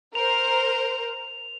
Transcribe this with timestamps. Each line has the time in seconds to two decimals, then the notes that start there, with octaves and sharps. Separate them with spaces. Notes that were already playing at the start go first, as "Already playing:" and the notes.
0.15 A#4 C5 F7